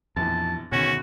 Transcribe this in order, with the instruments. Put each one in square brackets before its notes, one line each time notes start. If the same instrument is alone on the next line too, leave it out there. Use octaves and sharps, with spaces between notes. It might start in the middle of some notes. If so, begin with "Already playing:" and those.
[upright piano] A#1 B2 E3 [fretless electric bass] F2 [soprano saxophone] A5
[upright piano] F#1 D2 [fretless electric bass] B2 D#3 [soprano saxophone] C#4 [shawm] F#4